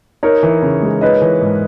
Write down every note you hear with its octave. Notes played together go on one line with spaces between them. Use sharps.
D#4 A#4 C#5
E3
C#3
G#3
D#4 B4 D#5
E3
G#2